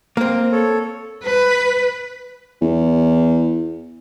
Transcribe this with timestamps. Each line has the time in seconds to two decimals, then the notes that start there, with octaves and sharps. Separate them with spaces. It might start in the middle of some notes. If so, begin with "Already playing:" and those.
0.17 A#3 C4
0.52 A4 C#5
1.23 B4
2.61 E2